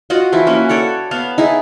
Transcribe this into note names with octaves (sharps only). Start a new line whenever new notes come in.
F4 F#4 D#5 F#5
E3 F3 E4 F4
A#3 C#4 F#4
A4 C#5 D5 F#5
B3 F5 A5
D#4 E4 G#4